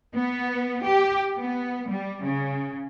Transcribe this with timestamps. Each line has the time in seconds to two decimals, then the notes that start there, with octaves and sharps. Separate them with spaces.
0.14 B3
0.85 G4
1.39 B3
1.90 G3
2.23 C#3